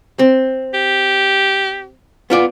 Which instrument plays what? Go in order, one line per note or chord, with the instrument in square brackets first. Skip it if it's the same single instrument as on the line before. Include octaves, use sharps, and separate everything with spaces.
[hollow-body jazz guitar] C4
[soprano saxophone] G4
[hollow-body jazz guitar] B3 F4 D5